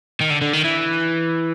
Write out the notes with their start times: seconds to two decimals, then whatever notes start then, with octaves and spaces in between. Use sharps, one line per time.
0.21 D#3
0.30 D3
0.42 D3
0.53 D#3
0.65 E3